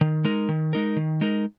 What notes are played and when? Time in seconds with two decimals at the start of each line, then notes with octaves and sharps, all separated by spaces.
0.01 D#3
0.24 G#3 D#4 A#4
0.49 D#3
0.73 G#3 D#4 A#4
0.96 D#3
1.21 G#3 D#4 A#4